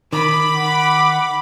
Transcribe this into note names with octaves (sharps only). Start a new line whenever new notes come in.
D#3 B5 D6
F#5 D6